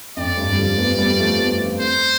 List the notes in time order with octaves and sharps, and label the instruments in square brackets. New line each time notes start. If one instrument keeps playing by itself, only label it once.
[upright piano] F2 [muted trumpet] D5
[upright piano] G2
G3
D3 F3
G3 B3
G3 B3
F3 A3
G3 B3
F3 A3
[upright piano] A3 C4 [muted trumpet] C5